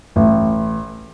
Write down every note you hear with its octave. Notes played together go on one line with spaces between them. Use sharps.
A1